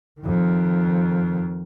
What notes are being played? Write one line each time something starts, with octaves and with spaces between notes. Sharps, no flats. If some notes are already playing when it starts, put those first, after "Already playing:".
F2 D#3